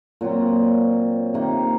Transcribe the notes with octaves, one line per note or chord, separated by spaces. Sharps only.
A#2 F#3 C4
C3 D#3 A#3